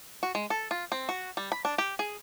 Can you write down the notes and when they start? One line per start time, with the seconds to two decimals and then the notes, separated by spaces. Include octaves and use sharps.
0.23 F#4
0.35 G#3
0.50 A4
0.71 F4
0.92 C4
1.09 F#4
1.37 G3
1.52 B5
1.65 D4
1.78 G4
1.99 G#4